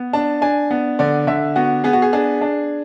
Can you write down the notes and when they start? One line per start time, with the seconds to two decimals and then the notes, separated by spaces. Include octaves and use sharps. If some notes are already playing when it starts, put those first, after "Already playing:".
Already playing: B3
0.13 D4 A5
0.42 D4 G#5
0.71 B3
0.99 D3 D5
1.27 D3 E5
1.56 B3 F#4
1.84 B3 G#4
1.93 F#4
2.02 G#4
2.13 D4 G#4
2.41 D4